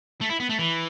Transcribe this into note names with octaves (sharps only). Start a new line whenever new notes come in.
A3
E4
B3
A3
E3